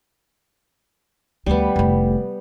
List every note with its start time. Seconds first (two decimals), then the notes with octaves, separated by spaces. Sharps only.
1.46 D2 D#3 G3 B3
1.76 F1 A2